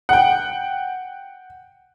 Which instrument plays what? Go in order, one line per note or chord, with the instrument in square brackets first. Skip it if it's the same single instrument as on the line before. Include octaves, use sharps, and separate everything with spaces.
[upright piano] F#5 G5